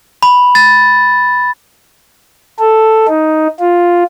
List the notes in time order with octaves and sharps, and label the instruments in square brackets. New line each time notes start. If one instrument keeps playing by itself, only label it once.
[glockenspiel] B5
A6
[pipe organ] A4
D#4
F4